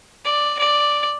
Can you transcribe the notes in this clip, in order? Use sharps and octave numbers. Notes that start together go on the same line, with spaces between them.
D5
D5